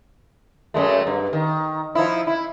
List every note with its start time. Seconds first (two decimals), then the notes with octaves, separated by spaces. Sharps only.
0.74 F#2 G#3 A3
1.07 G2
1.33 D#3
1.95 F3 D#4 E4
2.27 E4